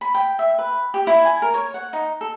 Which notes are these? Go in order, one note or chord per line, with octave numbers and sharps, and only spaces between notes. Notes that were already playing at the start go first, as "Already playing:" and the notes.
B5
G5
E5
B4
G4
E4
G#5
A#4
C#5
F#5
D#4
A4